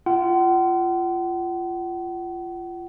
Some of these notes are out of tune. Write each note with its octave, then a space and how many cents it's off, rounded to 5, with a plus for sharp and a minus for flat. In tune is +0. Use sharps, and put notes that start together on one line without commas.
F4 -20 F#5 +40